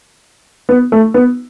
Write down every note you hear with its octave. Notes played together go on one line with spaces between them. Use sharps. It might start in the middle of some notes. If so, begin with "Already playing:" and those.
B3
A3
B3